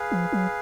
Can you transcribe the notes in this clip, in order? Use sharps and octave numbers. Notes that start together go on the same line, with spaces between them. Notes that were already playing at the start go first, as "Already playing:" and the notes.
Already playing: G#4 B4 F5
F3
F#3